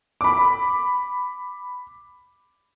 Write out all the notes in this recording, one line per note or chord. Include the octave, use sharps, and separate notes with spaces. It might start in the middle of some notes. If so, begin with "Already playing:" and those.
B5 D6